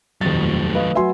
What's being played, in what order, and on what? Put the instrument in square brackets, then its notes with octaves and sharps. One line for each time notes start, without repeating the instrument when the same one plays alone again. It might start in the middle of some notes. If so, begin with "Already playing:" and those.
[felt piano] D#1 F2 A6 [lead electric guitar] D#3 F#3
[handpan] A3
[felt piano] B4 D#5 F5
[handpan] F#3 F#4 B4 [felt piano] E5 G#5 C6